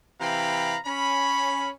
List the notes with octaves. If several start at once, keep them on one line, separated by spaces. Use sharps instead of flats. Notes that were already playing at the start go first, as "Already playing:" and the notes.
C3 E3 F5 G5 A#5 B5
C#4 B5